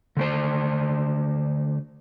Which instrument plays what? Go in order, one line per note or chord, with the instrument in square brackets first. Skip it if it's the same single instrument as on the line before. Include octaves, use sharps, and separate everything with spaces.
[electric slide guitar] D3 A3 C5